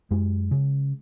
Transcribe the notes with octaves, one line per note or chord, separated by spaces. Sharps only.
F#2 G#3
C#3